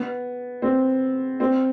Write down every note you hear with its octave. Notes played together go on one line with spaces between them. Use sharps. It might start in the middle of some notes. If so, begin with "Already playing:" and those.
Already playing: B3
C4
C4